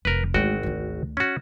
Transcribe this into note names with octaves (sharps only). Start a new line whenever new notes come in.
F1 A#4 B4
G#1 D2 G#3 F#4 G5
D2 D#3
C#4 F#4